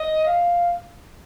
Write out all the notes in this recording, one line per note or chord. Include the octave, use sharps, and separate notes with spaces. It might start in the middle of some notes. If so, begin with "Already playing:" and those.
Already playing: D#5
F5